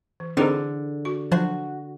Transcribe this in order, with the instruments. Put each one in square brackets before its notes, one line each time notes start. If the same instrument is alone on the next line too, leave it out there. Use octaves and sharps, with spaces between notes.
[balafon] E3
[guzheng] D3 [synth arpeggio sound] C4 D#4 A#4 [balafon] E4 G#4 C5
[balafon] F#4 C#6
[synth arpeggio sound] F3 F#3 C5 [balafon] D4 [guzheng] F#4